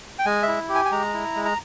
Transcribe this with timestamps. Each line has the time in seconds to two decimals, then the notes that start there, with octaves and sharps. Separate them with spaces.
0.19 G5
0.26 G#3 G#5
0.43 E5
0.48 E4
0.69 G4
0.75 G#5
0.85 G#5
0.91 G#3 A#5
1.14 E4
1.35 G#3
1.45 A#5